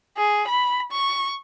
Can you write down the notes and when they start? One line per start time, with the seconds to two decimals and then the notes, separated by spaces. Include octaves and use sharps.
0.17 G#4
0.47 B5
0.92 C#6